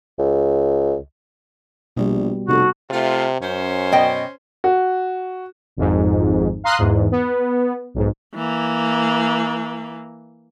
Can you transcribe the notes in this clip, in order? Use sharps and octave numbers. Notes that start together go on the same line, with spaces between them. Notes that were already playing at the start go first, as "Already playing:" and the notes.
C#2
A#1 B2 G3
F1 C3 F#4 A4
C3 A3 F4
F#2 C#4 C5
B2 D#5 G5
F#4
G#1 F2 G#2
F5 A#5 C6 D#6 F#6
E2 G#2
B3
B1 G#2
E3 A#3